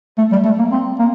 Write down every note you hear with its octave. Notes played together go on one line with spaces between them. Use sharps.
A3
G3
A3
A#3
C4
A#3